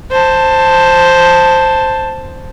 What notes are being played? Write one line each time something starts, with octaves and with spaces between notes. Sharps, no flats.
C5 A5